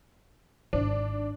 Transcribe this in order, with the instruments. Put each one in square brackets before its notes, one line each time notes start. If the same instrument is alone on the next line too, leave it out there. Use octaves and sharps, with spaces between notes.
[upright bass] G#1 [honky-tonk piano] D4